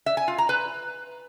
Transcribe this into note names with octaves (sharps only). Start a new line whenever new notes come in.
E5
G#5
F4
A#5
B4